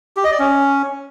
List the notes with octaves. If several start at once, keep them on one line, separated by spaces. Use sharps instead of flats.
G4
D#5
D5
C#4